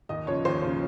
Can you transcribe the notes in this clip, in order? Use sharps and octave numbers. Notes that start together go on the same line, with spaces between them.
D#2 D#5
C#3 F3 C#5
D#2 C5
C#3 F3